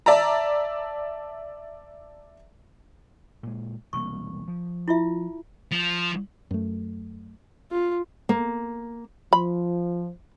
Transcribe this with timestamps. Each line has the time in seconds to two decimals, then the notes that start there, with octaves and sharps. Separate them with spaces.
0.06 D5 E5 A5 A#5
3.43 A#2 G#3
3.93 E1 C2 A#3 C#6
4.48 F3
4.88 E4 F4 E5
5.72 F3
6.51 F#2 A3
7.72 F4
8.29 A#3
9.33 F3 B5